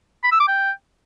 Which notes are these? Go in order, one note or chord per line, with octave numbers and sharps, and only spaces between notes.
B5
E6
D6
G5